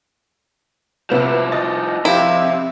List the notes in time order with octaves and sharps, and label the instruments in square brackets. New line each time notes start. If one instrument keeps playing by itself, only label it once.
[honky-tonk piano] C3 B3 E7 [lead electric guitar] F3 E4
[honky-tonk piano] D#5 A6
[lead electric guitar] C3 [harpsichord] F3 D#4 G4 [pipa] E4